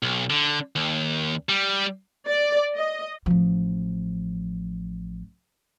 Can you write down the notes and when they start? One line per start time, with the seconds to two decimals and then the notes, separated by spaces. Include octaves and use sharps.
0.03 B1
0.30 D3
0.76 D#2
1.49 G3
2.28 D5
2.75 D#5
3.26 A1 F3